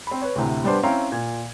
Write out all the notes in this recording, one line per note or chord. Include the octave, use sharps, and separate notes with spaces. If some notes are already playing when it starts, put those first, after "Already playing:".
C4 B5
B4 C#5
D2 A2 C3
G3 B3 D4 C5 C6
C4 C#4 E4 F5 G5 A#5
A#2 G#6